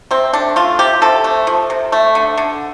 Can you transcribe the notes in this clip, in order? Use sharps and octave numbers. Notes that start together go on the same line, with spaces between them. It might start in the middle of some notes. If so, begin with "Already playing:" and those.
C3 C4
A3 D4
A3 F4
C3 G4
C3 A4
A3
F3
C3
A3
D3
D3